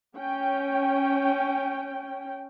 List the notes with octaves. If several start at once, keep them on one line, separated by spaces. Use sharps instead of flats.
C#4 G5